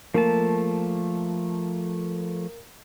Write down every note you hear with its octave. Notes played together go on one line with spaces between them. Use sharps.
F3 A3 A#3 A5